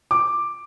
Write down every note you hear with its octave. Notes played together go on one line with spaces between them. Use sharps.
D6